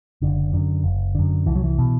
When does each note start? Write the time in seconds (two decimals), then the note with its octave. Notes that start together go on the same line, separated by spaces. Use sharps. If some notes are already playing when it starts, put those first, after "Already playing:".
0.22 F#1 D3
0.53 F#2 D3
0.84 F#1
1.15 F#2 D3
1.46 C2 E3
1.55 F#3
1.64 E3
1.78 B2